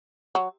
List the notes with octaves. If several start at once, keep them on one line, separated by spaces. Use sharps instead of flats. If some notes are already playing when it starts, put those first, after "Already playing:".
F#3